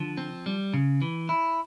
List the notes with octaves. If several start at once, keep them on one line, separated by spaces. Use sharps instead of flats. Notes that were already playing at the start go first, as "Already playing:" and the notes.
Already playing: D3 F3
C4
G3
C#3
E3
E4